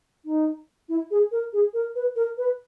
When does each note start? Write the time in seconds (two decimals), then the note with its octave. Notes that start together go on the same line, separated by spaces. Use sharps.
0.25 D#4
0.89 E4
1.11 G#4
1.32 A#4
1.53 G#4
1.74 A#4
1.95 B4
2.16 A#4
2.38 B4